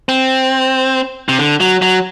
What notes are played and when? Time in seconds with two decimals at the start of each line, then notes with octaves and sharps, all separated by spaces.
0.09 C4
1.29 C3
1.39 D3
1.60 F#3
1.82 F#3